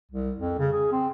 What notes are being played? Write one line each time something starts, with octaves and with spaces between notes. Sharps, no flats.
C2
F2
C#3
G#4
C4